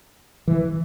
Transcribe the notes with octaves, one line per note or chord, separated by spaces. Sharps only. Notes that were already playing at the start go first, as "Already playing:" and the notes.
E3